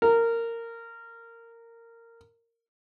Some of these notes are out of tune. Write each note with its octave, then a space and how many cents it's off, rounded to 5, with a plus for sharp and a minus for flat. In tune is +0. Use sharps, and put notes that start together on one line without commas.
A#4 -15